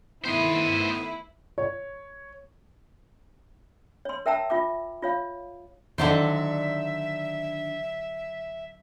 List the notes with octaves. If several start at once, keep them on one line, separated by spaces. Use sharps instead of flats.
D#3 A3 B3 E4 C5 D#5
C#5
C#5 C6
A#4 E5 G5 A5 A#5 E6
F4 E5 D6
F4 C#5 F5
D3 D#3 F#3 D4 D#4 C5 E5